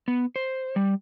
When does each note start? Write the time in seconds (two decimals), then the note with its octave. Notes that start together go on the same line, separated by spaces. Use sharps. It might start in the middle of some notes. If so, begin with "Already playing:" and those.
0.08 B3
0.36 C5
0.76 G3